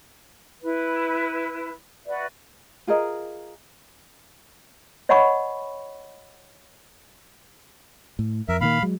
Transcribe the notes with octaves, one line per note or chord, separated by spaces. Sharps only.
E4 B4
F#4 B4 D5 E5
F4 G#4 A#4 D#5
C#5 D#5 F#5 G#5 B5 C#6
A2
F2 A#4 E5
A#2 D#3 A#3 F5 B5
F#3 G#3